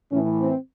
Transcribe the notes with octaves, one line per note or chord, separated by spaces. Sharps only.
A2 E3 C#4
C4